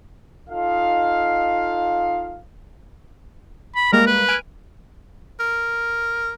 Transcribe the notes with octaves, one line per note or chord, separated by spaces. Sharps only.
D#4 F4 A4 D#5 F5
B5
G3 G#3 A#3 A#4
B4
G#5 F6 D7
A#4